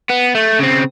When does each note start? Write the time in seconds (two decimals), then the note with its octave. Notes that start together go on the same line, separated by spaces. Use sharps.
0.09 B3
0.35 A3
0.59 C#3 C4